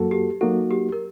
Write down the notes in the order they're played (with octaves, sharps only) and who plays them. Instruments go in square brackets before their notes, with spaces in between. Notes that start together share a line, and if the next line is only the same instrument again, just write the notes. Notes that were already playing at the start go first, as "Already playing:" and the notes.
Already playing: [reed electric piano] F#2 F#3 A#3 F#4 A4
[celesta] G4
[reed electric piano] F#3 A#3 D#4 F#4 [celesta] A4
[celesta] G4
A#4